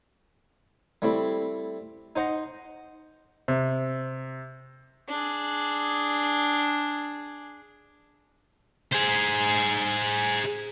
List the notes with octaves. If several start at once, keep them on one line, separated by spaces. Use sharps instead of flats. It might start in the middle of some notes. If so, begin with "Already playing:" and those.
G3 A3 C4 E4
D#4 C5 F#5 A#5
C3
D4 G#4
G#4 C5